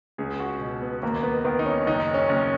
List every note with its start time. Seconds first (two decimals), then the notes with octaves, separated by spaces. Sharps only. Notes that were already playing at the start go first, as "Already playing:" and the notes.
0.18 C#2 G#4
0.39 F#4
0.60 B2
0.82 B3
1.02 D#2 A#3
1.23 B3
1.44 D#3 B3
1.59 D#4
1.66 C#4
1.86 F#1 D#4
2.14 C#4
2.29 F#1